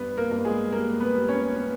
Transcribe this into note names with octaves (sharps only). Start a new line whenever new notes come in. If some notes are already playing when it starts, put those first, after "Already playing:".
Already playing: G2 B3 B4
A#3 A#4
G2
G#3 G#4
G3 A#3 A#4
B3 B4
G3
C#4 C#5
B3 B4